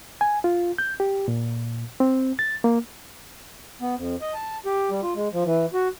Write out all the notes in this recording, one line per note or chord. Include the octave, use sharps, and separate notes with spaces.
G#5
F4
G6
G4
A#2
C4
A6
A#3
B3
F2
D#5
A5
G4
G3
F4
G#3
F3
E3
F#4